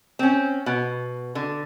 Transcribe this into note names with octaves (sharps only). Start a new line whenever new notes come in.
C4 C#4
B2
D3